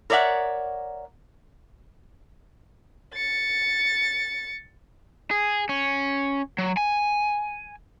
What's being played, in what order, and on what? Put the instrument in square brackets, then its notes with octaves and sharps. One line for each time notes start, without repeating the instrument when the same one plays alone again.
[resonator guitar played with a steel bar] A#4 C#5 D5 E5 F#5
[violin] A6 C#7
[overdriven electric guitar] G#4
C#4
F#3
G#5